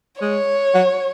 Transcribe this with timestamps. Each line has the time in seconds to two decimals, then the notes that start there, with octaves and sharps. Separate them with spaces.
0.21 G#3 C#5
0.74 F#3